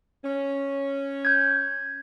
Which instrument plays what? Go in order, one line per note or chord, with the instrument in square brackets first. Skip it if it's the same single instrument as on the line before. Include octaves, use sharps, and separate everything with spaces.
[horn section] C#4
[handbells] G6 G#6